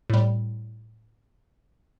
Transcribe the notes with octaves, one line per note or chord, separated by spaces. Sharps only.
A2 G3